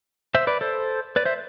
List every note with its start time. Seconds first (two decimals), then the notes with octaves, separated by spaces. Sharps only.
0.35 C5 E5
0.47 B4 D5
0.61 A4 C5
1.16 B4 D5
1.25 C5 E5